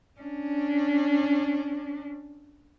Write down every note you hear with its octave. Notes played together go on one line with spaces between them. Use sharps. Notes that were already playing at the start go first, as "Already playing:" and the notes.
C#4 D4